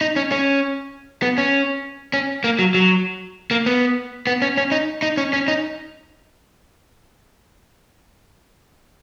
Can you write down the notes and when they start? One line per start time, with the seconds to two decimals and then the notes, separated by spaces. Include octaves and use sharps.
0.01 D#4
0.16 C#4
0.32 C#4
1.22 B3
1.38 C#4
2.13 C#4
2.44 A#3
2.59 F#3
2.74 F#3
3.51 A#3
3.66 B3
4.27 B3
4.42 C#4
4.58 C#4
4.72 D#4
5.02 D#4
5.17 C#4
5.33 C#4
5.48 D#4